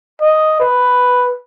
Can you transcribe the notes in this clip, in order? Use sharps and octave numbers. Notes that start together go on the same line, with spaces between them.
D#5
B4